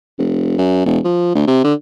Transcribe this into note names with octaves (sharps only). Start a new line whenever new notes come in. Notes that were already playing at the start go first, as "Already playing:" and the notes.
F1
F#2
E1
F3
D2
C3
D3